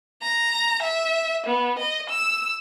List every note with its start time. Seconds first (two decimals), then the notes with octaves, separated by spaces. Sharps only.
0.23 A#5
0.83 E5
1.47 B3
1.79 D#5
2.10 E6